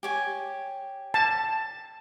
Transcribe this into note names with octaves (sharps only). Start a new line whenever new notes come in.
G4 C#5 G#5
A5